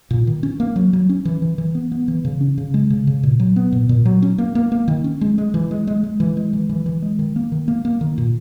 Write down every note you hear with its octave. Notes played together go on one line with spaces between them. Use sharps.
A#2
D#3
C#4
A#3
F#3
F#3
C#4
E3
E3
E3
B3
B3
E3
C#3
C#4
C#3
G#3
C#3
C#3
A#2
F#3
B3
A#2
A#2
F#3
C#4
A#3
A#3
A#3
D#3
C#4
G#3
G#3
E3
G#3
G#3
G#3
E3
G#3
E3
E3
E3
G#3
D#3
A#3
D#3
A#3
A#3
D#3
A#2